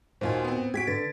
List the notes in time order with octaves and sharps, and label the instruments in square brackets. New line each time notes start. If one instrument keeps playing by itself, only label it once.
[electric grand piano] D#2 F4 G#5 [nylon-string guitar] A#2 D#4 F#4 [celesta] C5
[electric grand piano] B3 C4
[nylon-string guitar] F#4 G4 [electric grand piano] G#6 B6 D7
[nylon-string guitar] D3 [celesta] B4 [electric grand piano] A6